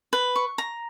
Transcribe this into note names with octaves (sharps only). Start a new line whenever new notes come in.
B4
C#6
A#5